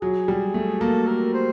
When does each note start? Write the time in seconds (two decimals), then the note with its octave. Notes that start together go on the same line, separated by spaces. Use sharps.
0.01 F#3 G#4
0.28 G3
0.54 A3
0.81 A#3 A4
1.07 A#4
1.34 C5